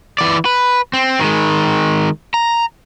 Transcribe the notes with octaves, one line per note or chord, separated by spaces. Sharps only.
E3 D5
B4
C4
D#3 G#3
A#5